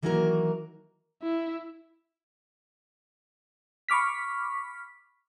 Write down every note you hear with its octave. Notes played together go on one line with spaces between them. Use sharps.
D#3 E3 F#3 A#3 F#4 A#4
E4
B5 C#6 D6 F6 B6